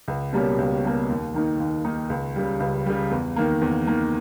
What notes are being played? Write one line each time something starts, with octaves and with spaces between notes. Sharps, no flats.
C#2
B2 G3 A#3 C#4
C#2
B2 G3 A#3 C#4
D#2
D#3 A#3 D#4
D#2
D#3 A#3 D#4
C#2
C#3 G3
C#2
C#3 G3
E2
D#3 A#3
E2
D#3 A#3